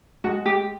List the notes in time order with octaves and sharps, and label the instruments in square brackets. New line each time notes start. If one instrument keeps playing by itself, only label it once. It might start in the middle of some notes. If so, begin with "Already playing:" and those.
[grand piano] G#3 [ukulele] F#4
[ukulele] G4